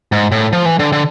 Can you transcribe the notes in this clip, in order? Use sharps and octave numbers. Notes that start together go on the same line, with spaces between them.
G#2
A2
F3
E3
D3
D3